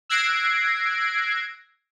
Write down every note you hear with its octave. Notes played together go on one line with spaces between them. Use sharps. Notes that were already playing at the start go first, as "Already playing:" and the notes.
E6 F#6 G#6 A#6 C7 D7